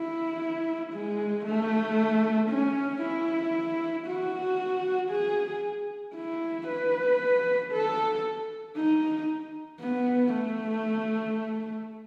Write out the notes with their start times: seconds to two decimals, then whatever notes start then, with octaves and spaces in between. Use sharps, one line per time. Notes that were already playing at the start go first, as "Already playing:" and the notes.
Already playing: E4
0.93 G#3
1.45 A3
2.50 C#4
3.02 E4
4.06 F#4
5.10 G#4
6.15 E4
6.68 B4
7.72 A4
8.76 D#4
9.80 B3
10.33 A3